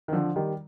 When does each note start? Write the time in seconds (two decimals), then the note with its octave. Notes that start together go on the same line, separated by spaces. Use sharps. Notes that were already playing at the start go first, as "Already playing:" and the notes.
0.08 D#3
0.12 D3 F3
0.36 D#3 G3